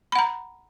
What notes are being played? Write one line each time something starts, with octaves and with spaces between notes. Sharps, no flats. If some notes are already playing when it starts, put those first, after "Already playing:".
F#5 A#5 B5